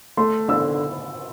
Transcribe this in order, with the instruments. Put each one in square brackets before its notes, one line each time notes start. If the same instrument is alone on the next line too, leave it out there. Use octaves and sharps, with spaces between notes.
[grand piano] A3 [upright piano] C6
[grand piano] D3 [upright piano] E6